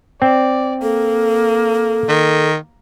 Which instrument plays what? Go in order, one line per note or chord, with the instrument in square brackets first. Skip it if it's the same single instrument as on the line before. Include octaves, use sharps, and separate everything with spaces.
[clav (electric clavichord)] C4 [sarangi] D5
[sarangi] A#3 [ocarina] A4
[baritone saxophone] D#3